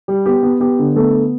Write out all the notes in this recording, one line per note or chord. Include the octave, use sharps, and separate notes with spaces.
G3
B3 G4
B3
B3 G4
D3
A3 B3 A4